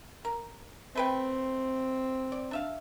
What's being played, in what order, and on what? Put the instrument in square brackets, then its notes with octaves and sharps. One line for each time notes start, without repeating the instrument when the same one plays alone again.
[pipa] A#4
[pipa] A3 B4 G5 [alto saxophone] C4
[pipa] D5
D4 E5 F5